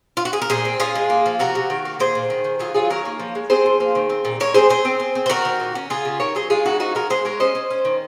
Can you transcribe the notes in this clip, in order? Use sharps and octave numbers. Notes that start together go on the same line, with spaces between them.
F4
F#4
G#4
A#4
A#2 G#4 C5
C4
C#4 F4 G#4
G#3
A#3
F3
C3 F#4 A#4
C3
D#3
A#3
A#2 G#4 C5
A#2
D#3
D#3
F#3 F4 G#4
F#3 F4 G#4
D#3 A#4 C#5
A#3
F3
G#3
C4 G#4 C5
F3
A#3
D#3
C4
A#2
G#3 A#4 C#5
C4 G#4 C5
C4 G#4 C5
C4
C4
C4
C5
D#3 F#4 A#4
D#3
A#2
C#4
C#3 F4 G#4
C#3
D#3 A#4 C#5
F#3 G#4 C5
G#3 F4 G#4
C#3 D#4 F#4
F3 D#4 F#4
G#3 F#4 A#4
G#3 G#4 C5
G#3 A#4 C#5
C#4 C5 D#5
C#4
C#4
D#3